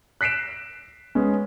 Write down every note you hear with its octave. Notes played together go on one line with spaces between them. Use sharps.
F#6 B6 C7 D7 E7
G#3 B3 C#4